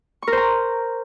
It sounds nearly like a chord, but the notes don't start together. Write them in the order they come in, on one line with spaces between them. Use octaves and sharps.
C#6 A#4 C5 A#5